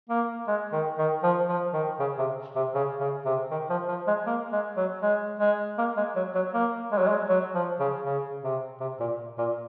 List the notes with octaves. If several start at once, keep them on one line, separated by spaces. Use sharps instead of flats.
A#3
G#3
D#3
D#3
F3
F3
D#3
C#3
C3
C3
C#3
C#3
C3
D#3
F3
F3
G#3
A#3
G#3
F#3
G#3
G#3
A#3
G#3
F#3
F#3
A#3
G#3
F#3
G#3
F#3
F3
C#3
C#3
C3
C3
A#2
A#2